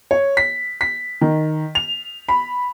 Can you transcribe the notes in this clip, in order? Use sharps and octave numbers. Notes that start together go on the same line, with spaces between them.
C#5
B6
B6
D#3
F7
B5